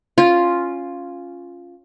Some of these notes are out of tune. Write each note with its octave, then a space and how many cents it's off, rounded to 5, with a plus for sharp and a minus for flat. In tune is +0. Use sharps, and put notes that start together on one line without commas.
C#4 +0 F4 +0